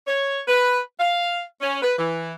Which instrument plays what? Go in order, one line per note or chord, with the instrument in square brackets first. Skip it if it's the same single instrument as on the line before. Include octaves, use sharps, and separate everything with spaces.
[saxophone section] C#5
B4
F5
C#4
B4
E3